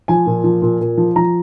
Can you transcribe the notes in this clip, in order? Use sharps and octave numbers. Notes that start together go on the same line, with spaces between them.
F3 G#5
A#2
F3
A#2
A#2
F3
F3 A#5